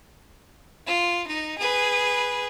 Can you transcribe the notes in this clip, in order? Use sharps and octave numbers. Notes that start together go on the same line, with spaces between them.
F4
D#4
G#4 B4